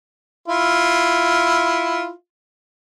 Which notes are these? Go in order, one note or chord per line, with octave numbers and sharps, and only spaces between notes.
E4 F4